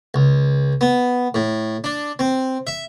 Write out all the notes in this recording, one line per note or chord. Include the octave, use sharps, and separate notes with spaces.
C#2
B3
A2
D4
C4
E5